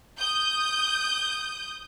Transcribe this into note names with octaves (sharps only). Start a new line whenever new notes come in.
D#6 G6